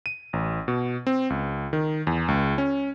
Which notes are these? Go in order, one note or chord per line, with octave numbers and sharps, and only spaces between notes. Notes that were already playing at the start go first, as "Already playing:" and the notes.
D#7
A1
B2
C4
C#2
D#3
E2
C#2
C#4